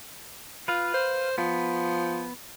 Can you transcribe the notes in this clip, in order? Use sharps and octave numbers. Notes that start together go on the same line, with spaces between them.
F4 B4 F5
C5
F3 B3